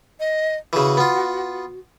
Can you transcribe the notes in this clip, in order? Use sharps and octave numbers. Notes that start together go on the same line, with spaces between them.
D#5
C#3 E3 F#4
B3 F4